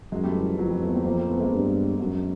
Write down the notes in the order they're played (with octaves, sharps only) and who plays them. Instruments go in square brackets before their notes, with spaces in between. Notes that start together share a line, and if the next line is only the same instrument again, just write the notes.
[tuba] F#2 [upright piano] F#3 G#3
[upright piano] G3 A3
E3
F3
[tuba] F2 [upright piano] E3 F#3
[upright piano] F3 G3
A3 B3
A#3 C4
[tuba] F2 [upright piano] A#3 C4
[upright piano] A#3 C4
A3 B3
G#3 A#3
[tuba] G2
[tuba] F#2 [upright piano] F#3 G#3